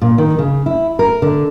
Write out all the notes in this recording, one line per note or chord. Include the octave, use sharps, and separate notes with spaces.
A#2
D#3
C#3
E4
A#4
D3